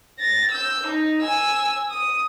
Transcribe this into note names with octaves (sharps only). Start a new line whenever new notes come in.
A6 A#6
E6 G6
D#4
G#5 E6
D#6